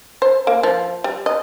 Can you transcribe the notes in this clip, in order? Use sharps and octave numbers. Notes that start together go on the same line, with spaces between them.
C5
A#3
F3
G3
D#5